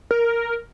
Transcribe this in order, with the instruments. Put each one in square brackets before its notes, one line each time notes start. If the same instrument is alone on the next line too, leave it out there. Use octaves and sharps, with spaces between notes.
[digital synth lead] A#4